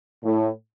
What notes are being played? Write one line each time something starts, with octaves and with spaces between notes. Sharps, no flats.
A2